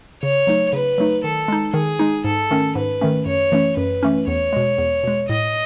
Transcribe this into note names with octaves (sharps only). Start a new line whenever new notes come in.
C#3 C#5
F#3 A3 D#4
C#3 B4
F#3 A3 D#4
D#3 A4
G#3 D#4
D#3 G#4
G#3 D#4
G#2 A4
D#3 A3 C#4
G#2 B4
D#3 A3 C#4
F#2 C#5
E3 A3 C#4
F#2 B4
E3 A3 C#4
E2 C#5
B2 G#3
E2
B2 G#3
A2 D#5